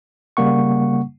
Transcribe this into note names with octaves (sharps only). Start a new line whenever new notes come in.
C#3 G3 A#3 F#5 C#6